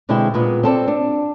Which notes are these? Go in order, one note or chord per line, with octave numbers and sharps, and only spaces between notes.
B2 D3 G#3 C4 E4 G5
A#2 G#3 B3
C4 A4 C5 D5
D4